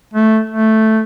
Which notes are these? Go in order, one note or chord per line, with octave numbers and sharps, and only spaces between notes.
A3
A3